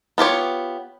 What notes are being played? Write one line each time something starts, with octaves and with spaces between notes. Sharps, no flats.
B3 F4 G4 C#5